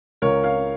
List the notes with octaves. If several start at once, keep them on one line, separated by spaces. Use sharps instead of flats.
C#2 A#4 C#5
C#5 F5